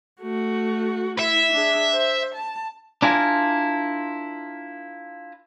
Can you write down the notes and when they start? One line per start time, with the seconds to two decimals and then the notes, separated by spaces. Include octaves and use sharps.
0.21 A3 F#4
1.19 E4 E5
1.52 D4 G#4
1.92 C5
2.34 A5
3.02 D4 E4 F4 A#4 G#5